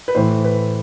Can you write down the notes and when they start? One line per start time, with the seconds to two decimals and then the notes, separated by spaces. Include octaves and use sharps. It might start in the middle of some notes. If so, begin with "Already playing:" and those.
0.08 B4
0.15 A2 E3 C5
0.45 B4